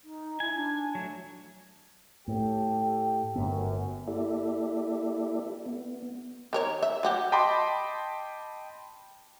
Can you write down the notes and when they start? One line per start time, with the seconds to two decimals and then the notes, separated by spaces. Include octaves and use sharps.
0.04 D#4
0.40 E4 G#5
0.54 D4
0.95 F#3 A3
2.28 A2 G4 A4 G5
3.36 G1 F#2 B3
4.08 A#3 E4 G4 A4 D5 E5
5.66 B3
6.53 D#3 A#4 C#5
6.83 E5
7.03 F#3 F#4 G4
7.32 D#5 G5 A5 B5 C6 D6